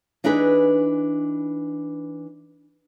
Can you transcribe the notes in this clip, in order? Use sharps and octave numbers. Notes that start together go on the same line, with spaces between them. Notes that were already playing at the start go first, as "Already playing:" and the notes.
E3 D4 D#4 G#4 B4